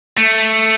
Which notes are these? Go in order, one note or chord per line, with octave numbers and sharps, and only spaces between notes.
A3